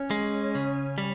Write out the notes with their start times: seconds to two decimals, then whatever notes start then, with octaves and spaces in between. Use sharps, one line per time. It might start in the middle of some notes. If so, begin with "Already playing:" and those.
Already playing: C#4
0.11 G#3
0.55 C#3
0.98 G3